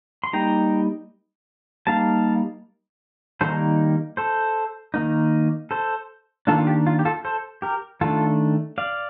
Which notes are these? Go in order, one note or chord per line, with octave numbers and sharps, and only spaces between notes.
C6
G3 A#3 D#4 G5 A#5
G3 A#3 D#4 F5 A5
D#3 G3 A#3 D#4 A4 C5
A4 C5
D#3 A#3 D#4
A4 C5
D#3 A#3 D4 F4 A4
F4
G4
F4
G4
F4 A4
A4 C5
G4 A#4
D#3 A3 D4 F4 A4
D5 F5